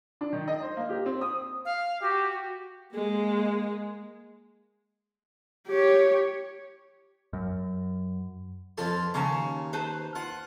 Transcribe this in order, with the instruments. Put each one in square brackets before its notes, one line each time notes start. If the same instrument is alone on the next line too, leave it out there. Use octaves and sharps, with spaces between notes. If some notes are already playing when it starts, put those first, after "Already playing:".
[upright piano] D4
D#3
D#5
C5
A#3
G4
C4
D#6
[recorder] F5
[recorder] F#4 [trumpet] G4
[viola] G#3 A#3
[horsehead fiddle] G4 C#5
[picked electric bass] F#2
[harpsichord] F2 F4 C6 [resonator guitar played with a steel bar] A4 B4
[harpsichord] D#2 A#5 [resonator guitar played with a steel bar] C#3 C#4 A5
[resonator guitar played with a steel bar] B4 C5 A5
[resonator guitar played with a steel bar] F4 [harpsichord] F#5